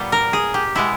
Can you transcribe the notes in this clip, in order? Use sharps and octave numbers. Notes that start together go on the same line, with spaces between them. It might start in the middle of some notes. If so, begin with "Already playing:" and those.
Already playing: A#2 G3 B3
A#4
G#4
G4
B2 G#3 B3 E4